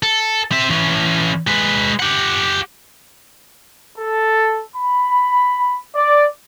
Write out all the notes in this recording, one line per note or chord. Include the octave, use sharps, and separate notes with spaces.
A4
C4 E5
E3 C#4
G#3 B4
G4 F#5
A4
B5
D5